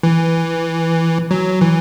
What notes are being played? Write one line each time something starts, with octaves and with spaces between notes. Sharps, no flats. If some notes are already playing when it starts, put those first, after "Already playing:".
E3
F#3
E3